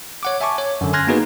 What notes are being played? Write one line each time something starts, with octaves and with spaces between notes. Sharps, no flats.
C#5 F#5 D6
E5 G#5 A5 C#6 D6
C#5
F#2 D3
G#5 C6 F6 F#6 G#6 A#6
A#3 B3 D#4 F#4 G#4 B4